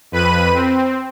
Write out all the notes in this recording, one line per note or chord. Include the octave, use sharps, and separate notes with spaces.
F2 B4 B5 D#7
C4